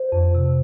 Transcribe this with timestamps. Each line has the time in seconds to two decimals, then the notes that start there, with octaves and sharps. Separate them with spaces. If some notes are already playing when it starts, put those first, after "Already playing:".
Already playing: C5
0.12 F2
0.35 C3